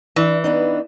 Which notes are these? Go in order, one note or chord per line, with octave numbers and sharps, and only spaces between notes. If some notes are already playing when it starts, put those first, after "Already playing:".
E3 D4 E4
B3 D4 D#4